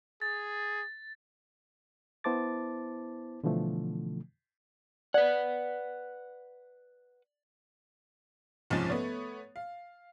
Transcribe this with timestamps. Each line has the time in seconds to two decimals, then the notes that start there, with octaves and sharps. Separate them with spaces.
0.22 G#4 A6
2.24 B3 E4 C5 A5 D6 A6
3.44 B2 D3 E3 F3 A3
5.14 B4 D5 F#5
8.70 F#1 C2 G#2 F3 C#4 A6
8.90 A3 B3 C#5
9.56 F5